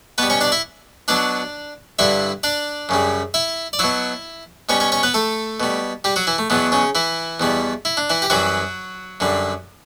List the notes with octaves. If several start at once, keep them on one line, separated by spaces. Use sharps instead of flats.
B2 G3 B3 B4
C#4 C#5
D4 D5
E4 E5
B2 F#3 D4 D5
G2 D3 G3 E4 E5
D4 D5
F#2 C#3 G3
E4 E5
D5
B2 F#3 E4 E5
B2 G3 C#4 C#5
C#4 C#5
C#4 C#5
B3 B4
A3 A4
B2 G3
G3 G4
F#3 F#4
E3 E4
A3
E2 B2 F#3 B3
C#3 C#4
E3 E4
E2 B2 G3
E4
D4
E3 E4
G4
F#2 E3 F#3 G3 F#4
F#2 D3 G3